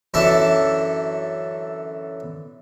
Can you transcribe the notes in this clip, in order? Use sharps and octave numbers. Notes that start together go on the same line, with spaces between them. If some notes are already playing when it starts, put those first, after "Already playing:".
F#2 D3 E3 A4 A5